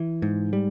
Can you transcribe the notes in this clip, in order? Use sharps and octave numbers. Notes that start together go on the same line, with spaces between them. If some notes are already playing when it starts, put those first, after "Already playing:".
Already playing: E3
G#2
G3